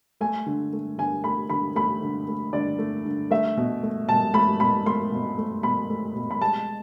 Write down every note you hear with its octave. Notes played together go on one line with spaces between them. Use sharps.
A3 G#5
D3
A3
D3 G#5
A3 B5
D3 B5
A3 B5
D3
A3
D3 D5
A3
D3
A3 E5
B2
A3
B2 A5
A3 B5
B2 B5
A3 C6
B2
A3
B2 B5
A3
B2
B5
G#3 A5